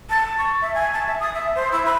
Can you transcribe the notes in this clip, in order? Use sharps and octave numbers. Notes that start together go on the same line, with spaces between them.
A5
C#6
E5
G#5
A5
E5
D#6
E5
C5
E4
B5